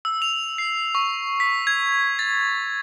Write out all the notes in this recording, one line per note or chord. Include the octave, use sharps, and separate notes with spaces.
E6
F7
C7
C#6
B6
G#6
A6